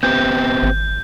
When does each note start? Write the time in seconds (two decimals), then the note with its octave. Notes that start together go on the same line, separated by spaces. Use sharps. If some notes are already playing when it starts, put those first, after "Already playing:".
0.03 B3 C4 G4 G6
0.63 G#1